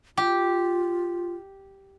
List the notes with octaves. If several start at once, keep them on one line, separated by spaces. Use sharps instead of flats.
F4 G4